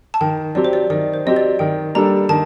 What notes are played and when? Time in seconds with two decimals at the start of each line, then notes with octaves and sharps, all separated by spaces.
0.14 A5
0.21 D#3 G5
0.55 F#3 C4 G4 D5
0.65 C5
0.73 D5
0.90 D#3 D5
1.14 C5
1.25 F#3 C4 G4 D#5
1.36 D5
1.59 D#3 G5
1.95 G3 A#3 D4 A4 A#5
2.29 D#3 A5